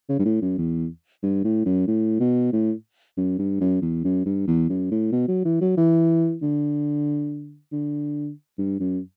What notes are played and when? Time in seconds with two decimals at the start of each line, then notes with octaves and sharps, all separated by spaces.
0.09 C#3
0.19 G2
0.25 A2
0.42 F#2
0.58 E2
1.23 G2
1.45 A2
1.66 F#2
1.88 A2
2.20 B2
2.53 A2
3.18 F#2
3.39 G2
3.61 F#2
3.82 E2
4.05 F#2
4.26 G2
4.48 E2
4.69 F#2
4.91 A2
5.12 B2
5.28 F#3
5.45 E3
5.61 F#3
5.77 E3
6.42 D3
7.72 D3
8.58 G2
8.80 F#2